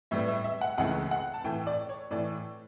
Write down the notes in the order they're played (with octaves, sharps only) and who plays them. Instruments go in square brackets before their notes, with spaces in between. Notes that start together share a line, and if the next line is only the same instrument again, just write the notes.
[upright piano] A2 G3 B3 E5
E5
E5
F#5
C#2 C#3 E3 A3 F#5
F#5
A5
A2 E3 A3 G5
D5
C#5
A2 E3 A3 D5